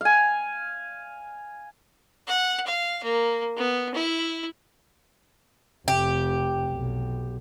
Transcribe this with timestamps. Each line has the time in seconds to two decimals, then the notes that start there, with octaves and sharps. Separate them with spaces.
0.01 F5 G#5
2.27 F#5
2.66 F5
3.04 A#3
3.57 B3
3.94 E4
5.88 F1 G4
6.71 B1